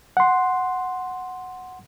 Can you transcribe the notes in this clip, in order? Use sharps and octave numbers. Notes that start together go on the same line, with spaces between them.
F#5 C6